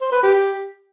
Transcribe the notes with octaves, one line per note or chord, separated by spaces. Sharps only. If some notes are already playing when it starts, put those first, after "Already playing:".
C5
B4
G4